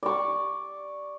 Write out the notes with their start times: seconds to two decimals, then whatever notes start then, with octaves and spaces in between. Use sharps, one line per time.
0.03 D5 C#6